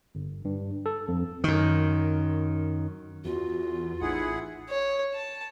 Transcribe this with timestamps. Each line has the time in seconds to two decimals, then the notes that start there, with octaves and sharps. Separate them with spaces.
0.15 G1
0.45 G2
0.86 A4
1.08 F2
1.44 F#2 D#3
3.24 E2 F4 F#4
4.01 A1 D#4 E4 G#4 F#5
4.69 C#5
5.14 A5